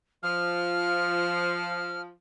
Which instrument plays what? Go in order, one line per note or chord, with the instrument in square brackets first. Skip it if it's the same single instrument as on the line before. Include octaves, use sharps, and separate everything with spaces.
[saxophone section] F3 [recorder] F6